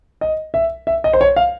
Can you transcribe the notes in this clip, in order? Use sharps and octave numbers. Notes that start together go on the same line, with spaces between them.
D#5
E5
E5
D#5
C5
C#5
F5